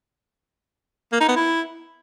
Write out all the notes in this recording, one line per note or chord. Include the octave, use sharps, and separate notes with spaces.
A#3
D#4
B3
E4